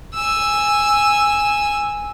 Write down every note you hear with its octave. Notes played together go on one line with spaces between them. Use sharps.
G#5 E6